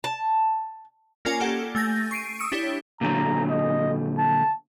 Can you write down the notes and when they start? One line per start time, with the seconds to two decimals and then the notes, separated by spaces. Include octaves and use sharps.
0.04 A5
1.25 A#3 C#4 F4 A#4 D5 G#5
1.40 G4 A4 F#5
1.75 A3 G#5 G6 A#6
2.11 C#6 C7 D7 D#7
2.39 D#6 E6 C#7 D7
2.52 D4 E4 G4 C#5
3.01 A#2 D3 F#3 A#5
3.50 D#5
4.18 A5